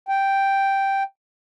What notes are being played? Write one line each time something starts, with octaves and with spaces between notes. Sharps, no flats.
G5